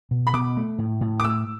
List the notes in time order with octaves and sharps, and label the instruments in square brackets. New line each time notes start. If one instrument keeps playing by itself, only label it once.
[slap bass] B2
[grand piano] B5
[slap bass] B2 [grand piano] D6
[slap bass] A3
A2
A2
[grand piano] D6
[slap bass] A2 [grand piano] E6